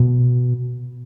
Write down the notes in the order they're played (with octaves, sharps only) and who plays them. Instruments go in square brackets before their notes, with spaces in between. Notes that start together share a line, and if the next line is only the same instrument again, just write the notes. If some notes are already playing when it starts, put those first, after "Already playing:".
Already playing: [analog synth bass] B2